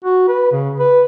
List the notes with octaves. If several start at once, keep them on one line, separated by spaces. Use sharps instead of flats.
F#4
B4
C#3
B4